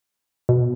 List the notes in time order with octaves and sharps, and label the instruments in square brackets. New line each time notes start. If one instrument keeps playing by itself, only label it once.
[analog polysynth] B2